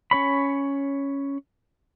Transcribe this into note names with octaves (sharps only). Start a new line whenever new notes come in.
C#4 C#5 B5